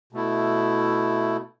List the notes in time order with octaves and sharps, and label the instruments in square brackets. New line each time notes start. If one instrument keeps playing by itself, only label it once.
[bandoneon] B2 A3 E4